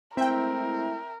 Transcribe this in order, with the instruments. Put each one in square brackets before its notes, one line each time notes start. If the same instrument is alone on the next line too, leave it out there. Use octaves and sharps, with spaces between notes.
[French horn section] G#3 A3 E4 [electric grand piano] C4 [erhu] A#4 [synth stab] E5 G5